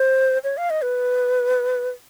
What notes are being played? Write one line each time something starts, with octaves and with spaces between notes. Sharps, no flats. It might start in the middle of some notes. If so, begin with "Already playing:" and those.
Already playing: C5
C#5
F5
D#5
B4